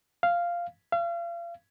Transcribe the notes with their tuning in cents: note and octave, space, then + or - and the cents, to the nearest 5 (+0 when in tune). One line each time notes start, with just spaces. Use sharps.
F5 -5
F5 -35